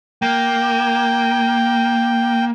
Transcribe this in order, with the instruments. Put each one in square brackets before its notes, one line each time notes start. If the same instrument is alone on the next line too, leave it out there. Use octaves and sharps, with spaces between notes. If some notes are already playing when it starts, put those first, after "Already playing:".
[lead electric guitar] A#3 [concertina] G5